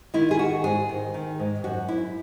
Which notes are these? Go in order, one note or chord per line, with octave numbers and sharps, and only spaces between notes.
D#3 E4
G#4
D#3 F#4
G#2 G#4
D#3
D#3
G#2
F#2 F#4
F#2 E4